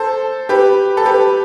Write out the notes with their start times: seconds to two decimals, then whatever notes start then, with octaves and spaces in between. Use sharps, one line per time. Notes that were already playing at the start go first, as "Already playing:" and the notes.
Already playing: A4 C5
0.49 G4 B4
0.97 A4
1.05 G4 B4